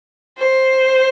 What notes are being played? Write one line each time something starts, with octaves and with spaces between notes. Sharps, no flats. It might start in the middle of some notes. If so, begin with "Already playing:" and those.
C5